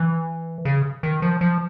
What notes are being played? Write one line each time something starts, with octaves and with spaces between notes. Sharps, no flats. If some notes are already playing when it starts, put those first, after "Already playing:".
Already playing: E3
C#3
D#3
F3
F3